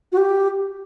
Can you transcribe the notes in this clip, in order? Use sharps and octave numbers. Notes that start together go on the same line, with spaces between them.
F#4
G4